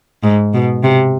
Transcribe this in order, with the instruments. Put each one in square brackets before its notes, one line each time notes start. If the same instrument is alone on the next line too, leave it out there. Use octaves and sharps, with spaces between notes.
[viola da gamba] G#2
B2
C3